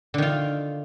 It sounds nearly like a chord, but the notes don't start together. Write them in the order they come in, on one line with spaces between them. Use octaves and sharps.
D3 D#3 F4